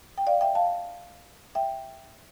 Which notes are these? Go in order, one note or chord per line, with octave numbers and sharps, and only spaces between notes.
G5
D5 F5
E5 G5
F5 A5
E5 G5